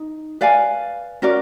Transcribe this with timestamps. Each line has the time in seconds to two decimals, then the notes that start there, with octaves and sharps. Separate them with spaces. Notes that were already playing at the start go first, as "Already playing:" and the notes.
Already playing: D#4
0.41 B4 D5 F5 G#5
1.22 C#4 F#4 A#4 D5